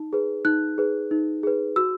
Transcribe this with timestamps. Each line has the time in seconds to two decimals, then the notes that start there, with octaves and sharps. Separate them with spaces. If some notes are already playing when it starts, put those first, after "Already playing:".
Already playing: D#4
0.13 G#4 B4
0.45 D#4 F#6
0.78 G#4 B4
1.11 D#4
1.43 G#4 B4
1.76 F#4 E6